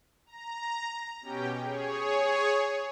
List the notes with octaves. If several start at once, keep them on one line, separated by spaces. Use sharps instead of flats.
A#5
B2 C#4 G4 G5
G#4 C#5